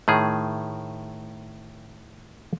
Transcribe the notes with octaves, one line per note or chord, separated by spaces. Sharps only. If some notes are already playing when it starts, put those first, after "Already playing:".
A2 D#3 G#4